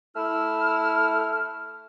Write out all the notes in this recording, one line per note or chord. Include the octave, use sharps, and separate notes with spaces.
A3 E4 E6 F6